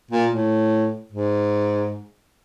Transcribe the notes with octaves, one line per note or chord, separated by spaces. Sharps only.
A#2
A2
G#2